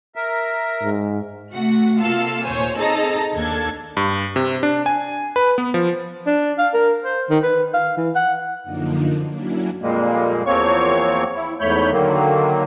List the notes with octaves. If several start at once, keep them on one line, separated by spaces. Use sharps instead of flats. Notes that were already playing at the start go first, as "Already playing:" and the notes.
A#4 E5
G#2
C3 A3 F#4 F#5
C3 A#3 F4 A4 F5 E6
D#2 A#2 C5 C#5 G#5
C4 D#4 G#4 A4 A5 A#5
D#2 A#3 D4 A4 G#6
G2
C3
D4
G#5
B4
B3
F3
D4
F5
A#4
C5
D#3
B4
F5
E3
F#5
F#2 D3 F3 A#3 D4 D#4
F#3 A#3 C#4 D4 E4 F#4
F2 A#2 G3 G#3 A#3
E2 F3 A#3 C4 C#5 C#6
E4
E2 G#2 A3 C#5 B5 G6
D3 D#3 F#3 A#3